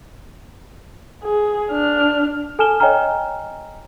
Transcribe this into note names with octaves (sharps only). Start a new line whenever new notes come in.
G#4
D4 F6
A4 G#5 A5 F6 E7 G7
C#5 D#5 G5 G#5 A#5 F6